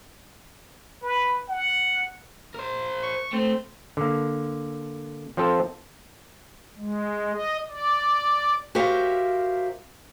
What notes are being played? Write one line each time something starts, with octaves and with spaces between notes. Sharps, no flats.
B4
F#5
A#4 C5
C#6
A3 C4
D3 A#3
F3 C4 F4 A4
G#3
D#5
D5
F#4 G4 A#4 C5 E5 F5